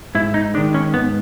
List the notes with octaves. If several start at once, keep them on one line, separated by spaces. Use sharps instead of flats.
G#2 E4
D#4
D#3 G#3 D4
C#4
G#2 B3